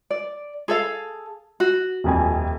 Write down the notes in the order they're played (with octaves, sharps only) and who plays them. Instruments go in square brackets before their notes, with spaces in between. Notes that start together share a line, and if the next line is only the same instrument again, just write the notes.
[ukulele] D5
G#4 A4 F5
F#4
[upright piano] D#1 F2 G#5